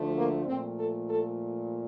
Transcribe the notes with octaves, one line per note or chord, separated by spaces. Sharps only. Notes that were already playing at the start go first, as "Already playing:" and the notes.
Already playing: D2 D3 F3 A3
A#3
A#2 F3 A3 C4
A4
A4